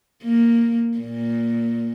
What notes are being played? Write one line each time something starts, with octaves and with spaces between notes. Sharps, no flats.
A#3
A#2